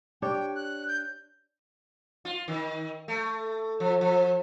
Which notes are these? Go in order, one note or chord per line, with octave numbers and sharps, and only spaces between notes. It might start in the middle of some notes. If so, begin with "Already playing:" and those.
D4 G4 C#5 G5
F#6
G6
F4
D#3
A3
F3
F3